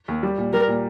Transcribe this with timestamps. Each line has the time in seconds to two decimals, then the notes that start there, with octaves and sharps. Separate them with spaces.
0.08 D#2
0.23 G3
0.38 A#2
0.53 G3 A#4
0.68 A#2